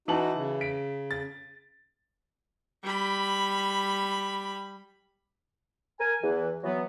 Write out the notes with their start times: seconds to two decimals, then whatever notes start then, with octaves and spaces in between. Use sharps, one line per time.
0.08 E3 D#4 F#4 A5 F#7
0.35 C#3
0.61 B6 D7
1.11 A6
2.83 G3 B5
6.00 A#4 G#5
6.23 E2 E3
6.64 E3 F#3 B3